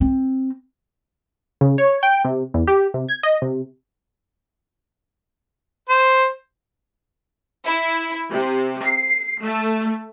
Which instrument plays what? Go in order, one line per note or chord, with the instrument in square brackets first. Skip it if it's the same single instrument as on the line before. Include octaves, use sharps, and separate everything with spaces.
[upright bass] C4
[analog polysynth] C#3
C#5
G5
C3
E2
G4
C3
G#6
D#5
C3
[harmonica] C5
[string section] E4
C3
C7
A3